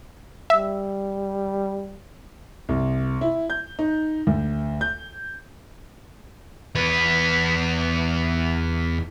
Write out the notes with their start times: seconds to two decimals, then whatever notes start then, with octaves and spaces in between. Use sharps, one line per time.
0.50 G3 E5
2.69 C2
3.21 E4
3.50 G6
3.79 D#4
4.27 D2
4.81 G6
6.75 E2 B4